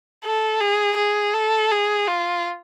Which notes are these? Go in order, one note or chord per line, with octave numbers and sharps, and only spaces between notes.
A4
G#4
G#4
A4
G#4
F4